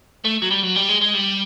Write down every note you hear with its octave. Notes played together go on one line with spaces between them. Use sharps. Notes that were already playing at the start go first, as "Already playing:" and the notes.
A3
F#3
G3
F#3
G3
G#3
G#3
G3